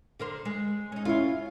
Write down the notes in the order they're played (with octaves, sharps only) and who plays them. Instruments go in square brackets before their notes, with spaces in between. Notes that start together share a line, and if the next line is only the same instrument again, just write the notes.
[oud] D3 A#4 C5
G#3
C#4 D#4
[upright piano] C#4 E4 [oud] F4 C#5